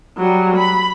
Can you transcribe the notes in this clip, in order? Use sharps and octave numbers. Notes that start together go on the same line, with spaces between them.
F#3 G3
B5